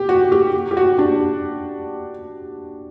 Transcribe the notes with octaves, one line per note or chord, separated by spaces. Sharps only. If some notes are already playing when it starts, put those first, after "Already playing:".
Already playing: G4
F#4
G4
G4
F#4
D4